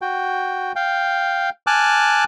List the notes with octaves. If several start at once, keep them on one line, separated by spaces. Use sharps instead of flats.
F#4 G5
F5 G5
G#5 A5 D6 F6 F#6